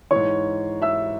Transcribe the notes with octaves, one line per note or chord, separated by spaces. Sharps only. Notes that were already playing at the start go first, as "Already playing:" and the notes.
G#2 E3 C#5 C#6
E5 E6